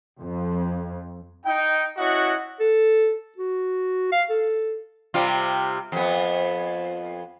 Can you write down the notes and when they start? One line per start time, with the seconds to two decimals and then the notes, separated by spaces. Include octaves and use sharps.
0.19 F2
1.45 D#4 G5
1.98 C#4 E4 F#4 D#5 F#5
2.60 A4
3.38 F#4
4.12 F5
4.30 A4
5.14 C3 G3 F4
5.92 F2 B3